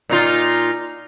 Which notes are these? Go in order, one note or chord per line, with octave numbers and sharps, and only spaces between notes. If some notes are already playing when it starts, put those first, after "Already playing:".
A#2 D#4 F4